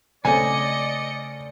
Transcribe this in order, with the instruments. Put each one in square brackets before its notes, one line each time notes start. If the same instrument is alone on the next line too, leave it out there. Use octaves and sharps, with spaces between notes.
[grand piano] C#3 A3 C4 [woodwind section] D5 [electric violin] D#5 C#7 [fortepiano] G#5